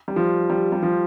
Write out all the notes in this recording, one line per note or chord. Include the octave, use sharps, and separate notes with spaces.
G3
F3
G3
G3
F3